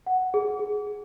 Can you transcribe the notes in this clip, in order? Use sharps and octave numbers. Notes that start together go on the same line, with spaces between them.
F#5
G#4
G#4
G#4